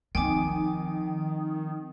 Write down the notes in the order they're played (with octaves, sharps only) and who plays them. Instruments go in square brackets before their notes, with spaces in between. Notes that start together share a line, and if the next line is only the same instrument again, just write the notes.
[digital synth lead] D#3 [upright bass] F3 C4 [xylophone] G5 G#5 D6